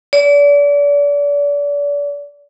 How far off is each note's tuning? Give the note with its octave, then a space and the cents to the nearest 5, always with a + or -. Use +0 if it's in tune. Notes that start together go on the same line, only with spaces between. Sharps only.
D5 -35